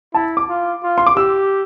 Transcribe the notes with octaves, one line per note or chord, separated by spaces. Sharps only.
E4 A5
D6
F4
F4
C6
D6
G4 E6